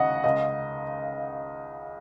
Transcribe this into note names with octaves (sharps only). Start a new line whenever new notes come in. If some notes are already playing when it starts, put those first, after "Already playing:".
Already playing: D#2 C#3 D#5 F#5
C#2 C#3 D#5